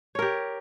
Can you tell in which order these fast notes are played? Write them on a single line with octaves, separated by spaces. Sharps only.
C#5 A#4 G4